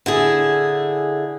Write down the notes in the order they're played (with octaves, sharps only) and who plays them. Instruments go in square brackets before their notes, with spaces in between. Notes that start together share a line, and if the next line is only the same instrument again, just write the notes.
[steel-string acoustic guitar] D3 E4 G#4